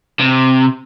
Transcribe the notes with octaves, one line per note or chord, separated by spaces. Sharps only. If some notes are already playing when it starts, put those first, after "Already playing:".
C3